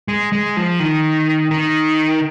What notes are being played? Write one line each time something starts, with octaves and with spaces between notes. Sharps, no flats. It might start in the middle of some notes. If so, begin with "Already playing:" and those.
G#3
G#3
F3
D#3
D#3